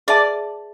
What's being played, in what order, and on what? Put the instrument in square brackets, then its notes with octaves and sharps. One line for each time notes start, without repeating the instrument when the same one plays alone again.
[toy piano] G#4 B4 E5 A5 [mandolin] D5